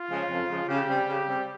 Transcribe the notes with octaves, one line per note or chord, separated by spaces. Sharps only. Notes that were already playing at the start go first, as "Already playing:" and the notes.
Already playing: F4
C#3 F3 G#3 C#4
F2
C#3 F3 G#3 C#4
C#3 G4
G3 C4
C#3
G3 C4